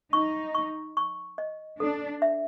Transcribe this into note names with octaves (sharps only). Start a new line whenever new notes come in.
D#4 C#6
C#6
C#6
D#5
D4 A4
E5